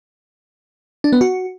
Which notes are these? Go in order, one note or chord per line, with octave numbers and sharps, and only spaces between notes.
D4
B3
F#4